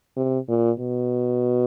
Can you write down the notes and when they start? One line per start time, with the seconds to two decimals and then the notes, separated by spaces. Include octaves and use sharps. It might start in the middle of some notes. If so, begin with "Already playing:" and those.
0.17 C3
0.48 A#2
0.79 B2